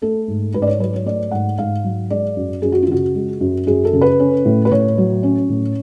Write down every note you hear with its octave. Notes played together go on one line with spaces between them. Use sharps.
A3 A4
G#2
G#2 B4
D5
C#5
F#3 B4
C#5
A3 D5
G#2 F#5
G#2 F5
F#3
G#3 D5
F#2
F#2 G#4
F#4
F4
C#3 F#4
G#3
F#2
F#2 G#4
A4
C#3
B4
C#4
A2
B4
A2 C#5
F#3
C#4
A2